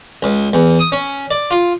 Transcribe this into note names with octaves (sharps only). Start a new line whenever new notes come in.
C#2
E2
D#6
C#4
D5
F4